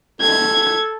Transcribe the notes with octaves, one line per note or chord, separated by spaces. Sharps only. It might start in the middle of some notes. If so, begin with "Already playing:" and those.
A4 G#6